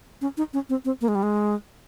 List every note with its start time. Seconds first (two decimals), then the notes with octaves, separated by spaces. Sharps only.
0.21 C#4
0.37 D#4
0.53 C#4
0.69 C4
0.85 C4
1.01 A#3
1.08 G#3
1.15 G3
1.23 G#3